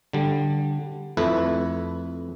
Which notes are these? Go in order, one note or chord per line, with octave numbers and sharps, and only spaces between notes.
D3 G3
F2 A3 E4 B4